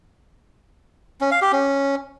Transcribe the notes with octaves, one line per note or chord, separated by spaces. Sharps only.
C#4
F5
G4
C#4